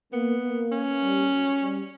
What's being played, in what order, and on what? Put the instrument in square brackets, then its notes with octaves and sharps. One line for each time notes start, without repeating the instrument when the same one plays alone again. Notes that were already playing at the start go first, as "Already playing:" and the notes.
[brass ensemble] A#3 [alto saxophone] B3
[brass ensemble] A#3
[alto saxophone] C#4
[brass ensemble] G3
F#3
G3